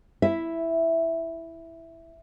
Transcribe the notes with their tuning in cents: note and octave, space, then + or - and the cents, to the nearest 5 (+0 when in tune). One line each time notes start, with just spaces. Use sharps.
E4 +0 E5 +0